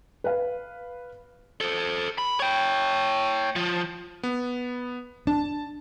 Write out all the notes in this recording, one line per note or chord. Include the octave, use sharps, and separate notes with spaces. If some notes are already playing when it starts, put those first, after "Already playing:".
B4 F5
A4 C5
B5
C#5 G5
F3
B3
D4 A5